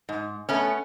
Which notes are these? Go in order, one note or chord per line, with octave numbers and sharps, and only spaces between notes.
G#2
A3 B3 C#4